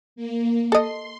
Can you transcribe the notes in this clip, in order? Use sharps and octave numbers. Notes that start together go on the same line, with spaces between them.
A#3
A4 D#5 C6